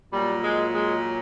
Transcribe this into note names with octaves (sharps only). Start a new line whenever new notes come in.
A#2 F#3 G3
G#3
G#3